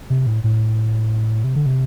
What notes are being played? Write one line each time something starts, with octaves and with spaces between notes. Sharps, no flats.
C3
A2
A2
C3
D3
C3